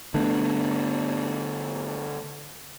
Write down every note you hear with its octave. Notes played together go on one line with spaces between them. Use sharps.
D3 A3 B3 D4